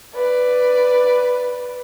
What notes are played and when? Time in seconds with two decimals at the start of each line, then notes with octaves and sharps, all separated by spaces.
0.14 B4 D5